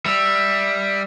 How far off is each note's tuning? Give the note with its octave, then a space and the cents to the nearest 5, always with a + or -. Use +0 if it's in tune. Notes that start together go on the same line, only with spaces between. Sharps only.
G3 +5 E5 +0